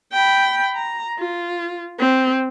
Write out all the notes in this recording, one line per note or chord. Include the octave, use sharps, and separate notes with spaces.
G5 B5
A#5
F4
C4